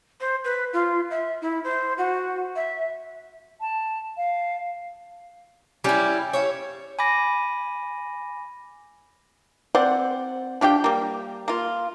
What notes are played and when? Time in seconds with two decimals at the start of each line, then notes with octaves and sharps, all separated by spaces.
0.20 C5
0.44 B4
0.73 F4
1.10 E5
1.41 E4
1.64 C5
1.98 F#4
2.56 E5
3.61 A5
4.17 F5
5.84 G3 C#4 E4 G4
6.33 C#5 E5 F5
6.99 G#5 B5 D6 A#6
9.75 C4 C5 D5 F#5
10.61 F3 D4 G4 G5
10.84 G3 A#3
11.48 A#3 F4